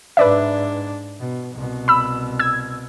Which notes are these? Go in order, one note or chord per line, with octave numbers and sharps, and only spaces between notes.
G#2 D4 B4 D5 E5
B2
C2 B2
B5 E6
E6 G#6